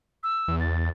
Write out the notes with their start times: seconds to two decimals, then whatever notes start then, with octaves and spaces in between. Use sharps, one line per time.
0.23 E6
0.48 E2
0.60 A6